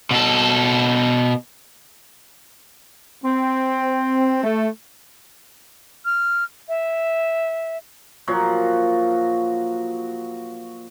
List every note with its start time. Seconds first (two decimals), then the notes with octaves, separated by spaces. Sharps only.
0.11 B2 A4
3.25 C4
4.44 A3
6.05 F6
6.68 E5
8.27 A#2 F3 F#3 F#4